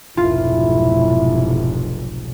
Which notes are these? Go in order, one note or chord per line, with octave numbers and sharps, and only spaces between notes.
F1 B1 G#2 E4 F4